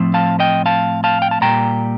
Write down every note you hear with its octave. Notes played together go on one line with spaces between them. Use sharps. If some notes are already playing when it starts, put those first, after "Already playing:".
Already playing: A2 F3 A3 C4
F5 A5
D#5 G5
F5 A5
F5 A5
G5
A5
A#2 G3 A#3 G5 A#5